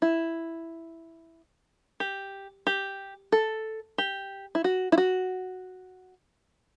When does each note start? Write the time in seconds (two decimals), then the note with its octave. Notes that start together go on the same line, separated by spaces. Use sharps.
0.02 E4
2.00 G4
2.67 G4
3.32 A4
3.98 G4
4.55 E4
4.64 F#4
4.92 E4
4.98 F#4